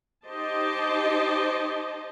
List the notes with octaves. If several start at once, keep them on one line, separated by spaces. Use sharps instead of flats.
D#4 G4 C5 D#5 A5